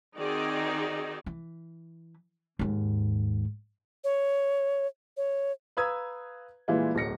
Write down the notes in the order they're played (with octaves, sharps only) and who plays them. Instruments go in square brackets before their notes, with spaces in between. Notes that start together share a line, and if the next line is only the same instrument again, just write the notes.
[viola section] D#3 C4 D#4 F#4 G#4 D5
[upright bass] E3
D#2 G#2
[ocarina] C#5
C#5
[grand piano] B4 F5 A#5 D#6 E6 G#6
A#2 E3 G3 G#3 E4 F4
D1 B1 F#3 A#6 C#7